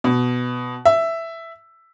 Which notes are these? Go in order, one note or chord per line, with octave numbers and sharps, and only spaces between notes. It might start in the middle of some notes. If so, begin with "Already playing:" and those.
B2
E5